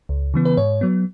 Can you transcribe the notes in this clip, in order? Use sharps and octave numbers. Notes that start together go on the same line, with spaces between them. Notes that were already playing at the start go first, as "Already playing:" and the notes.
C#2
C#3 E3 B3
B4
G#2 C#5
F#3 B3